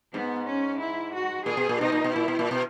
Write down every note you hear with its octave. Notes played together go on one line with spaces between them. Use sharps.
G#2 B3
C#4
E4
F#4
A#2 G#4
B2
A#2
B2 D#4
A#2
B2
A#2 E4
B2
A#2
B2